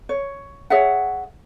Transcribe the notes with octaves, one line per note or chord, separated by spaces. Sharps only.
C#5
G#4 C#5 E5 F#5